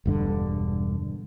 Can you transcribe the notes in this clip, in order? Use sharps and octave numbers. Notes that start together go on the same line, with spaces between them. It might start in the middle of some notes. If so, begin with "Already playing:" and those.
E1 G2 D3